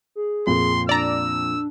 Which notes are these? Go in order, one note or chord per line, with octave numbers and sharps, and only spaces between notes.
G#4
F2 A#2 C6
D4 D5 A#5 E6